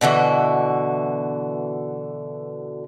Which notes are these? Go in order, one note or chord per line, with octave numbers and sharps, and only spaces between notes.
B2 D3 E3 F#4